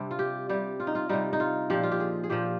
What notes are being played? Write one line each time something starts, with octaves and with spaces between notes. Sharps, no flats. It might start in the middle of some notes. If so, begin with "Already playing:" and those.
Already playing: C3 G3 C4 D4
F4
G4
C3 G3 G4
F4
D#4
F4
C3 G3 D#4
D#4
F4
A#2 F3 G4
F4
G4
G#4
G#4
A#2 F3 G4